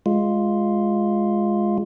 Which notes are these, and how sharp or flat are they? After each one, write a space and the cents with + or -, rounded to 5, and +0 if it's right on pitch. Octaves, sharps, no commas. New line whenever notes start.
G#3 +0 F4 +0